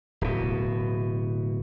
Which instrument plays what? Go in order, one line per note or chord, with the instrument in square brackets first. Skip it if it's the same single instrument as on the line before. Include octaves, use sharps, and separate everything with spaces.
[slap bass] D1 B2